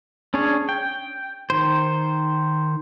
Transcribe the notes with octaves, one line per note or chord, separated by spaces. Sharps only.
C#4 D4 G#4 C#5
G5
D#3 C5